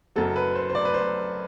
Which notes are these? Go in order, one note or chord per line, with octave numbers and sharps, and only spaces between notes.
F#1 F#2 F#3 A4
B4
C5
C5
D5
B4
C5